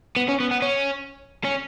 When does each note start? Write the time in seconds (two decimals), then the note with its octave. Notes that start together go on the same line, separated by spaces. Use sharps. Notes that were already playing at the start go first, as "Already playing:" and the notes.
0.16 B3
0.29 C#4
0.40 B3
0.51 B3
0.62 C#4
1.44 C#4